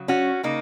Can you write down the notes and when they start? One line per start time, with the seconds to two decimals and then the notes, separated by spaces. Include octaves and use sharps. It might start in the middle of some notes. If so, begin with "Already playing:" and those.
Already playing: C#3 F#3
0.08 C#4 F#4
0.43 C#3 A#3 D#4